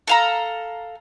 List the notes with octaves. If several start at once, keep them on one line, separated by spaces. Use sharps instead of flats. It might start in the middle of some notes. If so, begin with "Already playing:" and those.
A4 F5 A#5